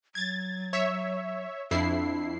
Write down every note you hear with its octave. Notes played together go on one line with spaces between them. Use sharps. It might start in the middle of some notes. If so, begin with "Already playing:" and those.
F#3 G#6 A6
C#5 E5
F2 D4 E4 C7